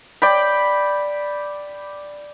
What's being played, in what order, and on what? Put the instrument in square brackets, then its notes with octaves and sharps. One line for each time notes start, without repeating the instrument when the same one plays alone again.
[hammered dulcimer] D5 G5 B5